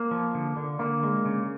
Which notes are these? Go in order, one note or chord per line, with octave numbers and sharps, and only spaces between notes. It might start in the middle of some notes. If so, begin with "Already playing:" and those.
Already playing: A#3
F3
D3
D3
D3 A#3
G#3
C#3